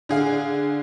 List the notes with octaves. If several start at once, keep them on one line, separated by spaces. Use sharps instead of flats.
D3 G#4 F5